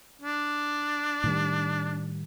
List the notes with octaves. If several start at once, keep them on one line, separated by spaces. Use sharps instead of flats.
D4
A2 D#3 G3